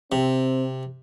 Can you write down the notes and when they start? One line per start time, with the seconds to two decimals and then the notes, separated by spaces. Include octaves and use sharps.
0.12 C3 C4